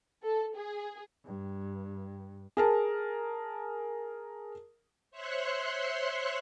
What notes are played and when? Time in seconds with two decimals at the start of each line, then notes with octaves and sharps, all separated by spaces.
0.23 A4
0.56 G#4
1.26 G2
2.57 G#4 A#4 A5
5.11 C5 C#5 E5 C6 C#6 F#6